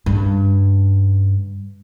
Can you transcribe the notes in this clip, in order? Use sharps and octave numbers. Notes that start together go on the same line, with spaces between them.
G2 C#3